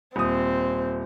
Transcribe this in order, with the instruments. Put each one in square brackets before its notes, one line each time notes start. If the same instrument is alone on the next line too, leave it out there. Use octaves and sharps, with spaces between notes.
[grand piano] D#1 D#6 [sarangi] C4